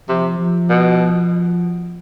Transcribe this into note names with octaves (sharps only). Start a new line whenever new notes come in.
C3 F3
F3
B2